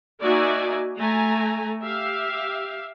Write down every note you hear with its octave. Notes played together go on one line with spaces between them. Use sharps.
A#3 D#4 F#4 D5 E5 G#5
A3 G#5 A#5
G4 E5 F5